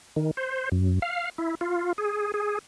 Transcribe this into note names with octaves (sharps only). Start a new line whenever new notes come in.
D#3
C5
F#2
F5
E4
F4
G#4
G#4